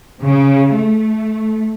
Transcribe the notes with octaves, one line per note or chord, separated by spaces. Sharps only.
C#3
A3